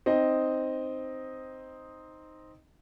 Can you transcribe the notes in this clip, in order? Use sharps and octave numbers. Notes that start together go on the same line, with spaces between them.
C4 D#4 D#5